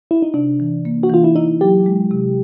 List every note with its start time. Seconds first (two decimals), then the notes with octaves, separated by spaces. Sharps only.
0.11 E4
0.22 D#4
0.34 C3 D4
0.60 E3
0.85 A#3
1.03 F#4
1.10 E3 F4
1.24 E4
1.36 D#4 E4
1.61 F#3 G4
1.86 G#3
2.11 C3